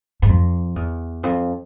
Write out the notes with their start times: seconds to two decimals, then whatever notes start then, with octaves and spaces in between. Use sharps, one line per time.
0.22 G#2
0.29 F2
0.76 E2
1.23 F2